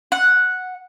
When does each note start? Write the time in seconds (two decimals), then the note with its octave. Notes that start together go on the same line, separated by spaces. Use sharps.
0.12 F#5